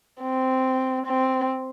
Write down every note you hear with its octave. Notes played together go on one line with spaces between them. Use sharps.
C4
C4